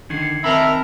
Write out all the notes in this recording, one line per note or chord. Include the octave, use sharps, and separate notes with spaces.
D3 D#3 G#6 C7
D#3 C4 A#4 E5 A5 B5 F6